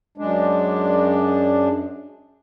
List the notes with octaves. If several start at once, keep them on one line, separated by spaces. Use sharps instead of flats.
F#2 G#3 D4